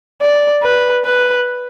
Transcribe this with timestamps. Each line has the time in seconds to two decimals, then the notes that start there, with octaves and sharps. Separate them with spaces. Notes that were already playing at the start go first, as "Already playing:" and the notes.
0.21 D5
0.63 B4
1.05 B4